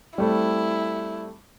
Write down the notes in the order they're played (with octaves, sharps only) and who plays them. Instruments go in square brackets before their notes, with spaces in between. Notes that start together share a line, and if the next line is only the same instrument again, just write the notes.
[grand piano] G3 A3 C4 [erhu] E4